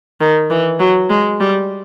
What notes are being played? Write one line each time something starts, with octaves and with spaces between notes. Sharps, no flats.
D#3
E3
F#3
G#3
G3